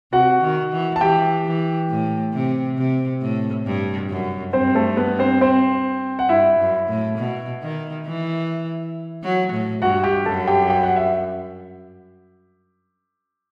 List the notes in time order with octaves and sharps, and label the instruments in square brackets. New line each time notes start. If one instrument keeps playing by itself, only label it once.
[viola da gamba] C3 [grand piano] F#4 F#5
[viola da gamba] D#3
E3
[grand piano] A5
[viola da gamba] E3 [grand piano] G4 G5
[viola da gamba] E3
A2
C3
C3
A2
G2
F#2
[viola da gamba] G2 [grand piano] C4 C5
[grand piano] A3 A4
B3 B4
C4 C5
C4 C5
F#5
[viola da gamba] G2 [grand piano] E4 E5
[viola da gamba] F#2
A2
B2
D#3
E3
F#3
A2
[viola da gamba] G2 [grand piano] F#4 F#5
[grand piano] G4 G5
[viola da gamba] F#2 [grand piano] A4 A5
[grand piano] G4 G5
G5
F#5
E5